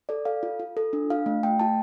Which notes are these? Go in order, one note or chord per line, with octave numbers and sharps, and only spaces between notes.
A4 D5
A4 F5
F4
F4
A4
D4
F4 F5
A3
A3 G5
F4 A5